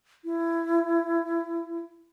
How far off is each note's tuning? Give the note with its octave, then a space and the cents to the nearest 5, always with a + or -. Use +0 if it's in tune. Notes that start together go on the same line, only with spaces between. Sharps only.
E4 +20